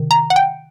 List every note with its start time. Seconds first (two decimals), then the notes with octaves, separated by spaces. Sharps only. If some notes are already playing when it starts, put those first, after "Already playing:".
Already playing: C3 D#3
0.11 A#5
0.30 F#5
0.36 G5